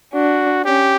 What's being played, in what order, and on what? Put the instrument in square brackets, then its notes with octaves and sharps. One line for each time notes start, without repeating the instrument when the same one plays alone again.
[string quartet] D4 [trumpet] F#4
[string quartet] C#4 [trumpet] G4